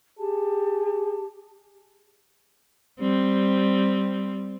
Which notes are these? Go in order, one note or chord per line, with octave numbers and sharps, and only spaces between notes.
G4 G#4 A5
G3 C4